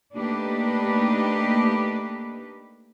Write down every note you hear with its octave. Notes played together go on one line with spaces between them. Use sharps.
A3 A#3 D4 D#4 G4 B4